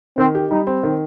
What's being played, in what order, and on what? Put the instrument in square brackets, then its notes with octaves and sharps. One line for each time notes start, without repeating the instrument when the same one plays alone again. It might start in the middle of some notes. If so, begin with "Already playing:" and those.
[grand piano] D#3 [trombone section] C4
[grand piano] G4
[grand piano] G3 [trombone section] D#4
[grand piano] C4
D#3